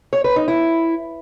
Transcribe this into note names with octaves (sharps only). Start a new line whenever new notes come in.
C#5
B4
D#4
E4